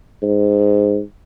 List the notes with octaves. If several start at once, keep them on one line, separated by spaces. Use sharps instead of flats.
G#2